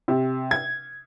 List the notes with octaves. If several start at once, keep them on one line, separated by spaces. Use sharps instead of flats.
C3
G#6